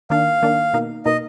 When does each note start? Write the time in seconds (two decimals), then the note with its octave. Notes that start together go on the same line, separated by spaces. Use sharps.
0.10 D#3 A#3 D4 F5
0.42 D#3 A#3 D4
0.73 B2 A#3 D#4
1.06 B2 A#3 D#4 D#5